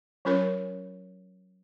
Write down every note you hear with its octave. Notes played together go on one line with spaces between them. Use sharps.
F#3 C#4 F4 A#4 C#5